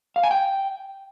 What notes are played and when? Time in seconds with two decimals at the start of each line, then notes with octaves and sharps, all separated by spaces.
0.16 F5
0.23 G#5
0.31 G5